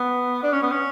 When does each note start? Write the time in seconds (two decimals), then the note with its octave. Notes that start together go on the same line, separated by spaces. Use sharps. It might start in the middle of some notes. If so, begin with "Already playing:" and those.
Already playing: B3
0.43 D4
0.53 C#4
0.62 B3
0.72 C#4